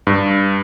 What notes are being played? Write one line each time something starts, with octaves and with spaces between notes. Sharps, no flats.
G2